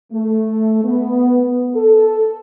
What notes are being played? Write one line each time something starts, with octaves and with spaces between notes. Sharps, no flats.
A3
B3
A4